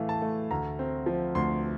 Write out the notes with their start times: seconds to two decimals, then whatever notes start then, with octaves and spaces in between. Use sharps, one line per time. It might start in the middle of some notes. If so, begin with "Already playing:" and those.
Already playing: A2 E3 A3 F5
0.09 A5
0.22 A3
0.51 D2 A#5
0.79 C4
1.06 F3
1.35 D2 C6